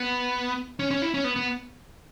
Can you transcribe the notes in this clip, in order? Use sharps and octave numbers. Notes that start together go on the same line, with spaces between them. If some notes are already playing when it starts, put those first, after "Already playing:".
Already playing: B3
C#4
C#4
E4
C#4
B3
B3